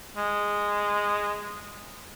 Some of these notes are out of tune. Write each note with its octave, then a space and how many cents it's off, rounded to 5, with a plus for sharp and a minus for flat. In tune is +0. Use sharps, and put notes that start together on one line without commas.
G#3 -10